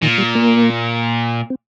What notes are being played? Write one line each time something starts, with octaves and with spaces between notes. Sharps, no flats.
A#2 D#3
G3
A#3
C4